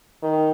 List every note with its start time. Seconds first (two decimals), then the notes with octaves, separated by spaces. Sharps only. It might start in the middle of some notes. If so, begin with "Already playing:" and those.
0.23 D#3